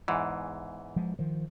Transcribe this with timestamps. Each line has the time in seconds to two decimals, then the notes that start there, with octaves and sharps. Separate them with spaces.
0.08 E2 G#2 E3
0.96 F3 G#3
1.19 D#3 F3